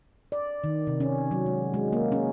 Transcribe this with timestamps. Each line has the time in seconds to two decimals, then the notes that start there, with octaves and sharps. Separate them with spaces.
0.32 D5
0.64 D#3
0.87 C3
1.00 C#4
1.31 F#3
1.46 G#3
1.74 G#3
1.93 A#3
2.12 C#4